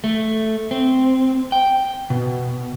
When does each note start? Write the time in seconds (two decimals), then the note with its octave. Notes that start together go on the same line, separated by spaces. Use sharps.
0.04 A3
0.71 C4
1.52 G5
2.10 B2